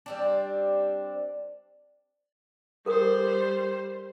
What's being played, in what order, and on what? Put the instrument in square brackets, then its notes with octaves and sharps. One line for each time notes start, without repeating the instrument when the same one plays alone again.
[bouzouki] G3 C4 D4
[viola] G3 C5 [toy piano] A4 A#4 D#6